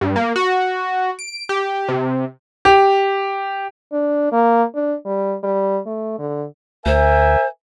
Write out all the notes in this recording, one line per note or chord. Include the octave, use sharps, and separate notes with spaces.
G2
A#3
F#4
D7
G4
C3
G4
D4
A#3
D4
G3
G3
A3
D3
D2 A#4 C5 E5 G#5